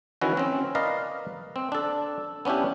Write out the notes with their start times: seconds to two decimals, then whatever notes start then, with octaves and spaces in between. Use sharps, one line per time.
0.22 D#3 E3 C#4 E4 F#4
0.37 C4 C#4
0.75 A#4 B4 D5 D#5 F5
1.56 C4
1.72 D4 A4
2.45 B3 C#4 D4 E4 G4